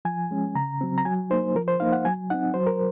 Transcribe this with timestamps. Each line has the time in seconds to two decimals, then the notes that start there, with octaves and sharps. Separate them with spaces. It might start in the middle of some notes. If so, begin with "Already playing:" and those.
0.05 F3 G#5
0.31 G#3 C#4
0.55 C#3 A#5
0.81 F#3 C4
0.98 A#5
1.05 F#3 G#5
1.30 A#3 D#4 C5
1.55 F3 A#4
1.68 C5
1.80 A#3 D#4 F5
1.92 F#5
2.05 F#3 G#5
2.30 C4 D#4 F#5
2.54 F#3 C5
2.67 A#4